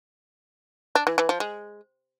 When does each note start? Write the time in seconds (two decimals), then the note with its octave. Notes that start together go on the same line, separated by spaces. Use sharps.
0.95 D4
1.07 E3
1.18 E3
1.29 F3
1.40 G#3